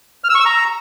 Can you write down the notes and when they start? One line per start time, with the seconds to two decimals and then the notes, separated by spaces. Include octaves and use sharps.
0.24 F6
0.29 E6
0.35 C#6
0.40 E6
0.45 A#5